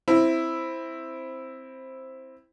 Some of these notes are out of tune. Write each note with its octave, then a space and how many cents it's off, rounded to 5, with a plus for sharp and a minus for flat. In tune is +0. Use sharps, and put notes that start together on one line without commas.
C4 +5 E4 +0